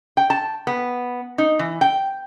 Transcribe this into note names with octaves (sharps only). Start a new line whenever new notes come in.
G5
A5
B3
D#4
E3
G5